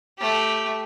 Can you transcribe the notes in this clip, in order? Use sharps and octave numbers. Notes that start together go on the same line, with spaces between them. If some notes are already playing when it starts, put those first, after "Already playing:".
A3 G4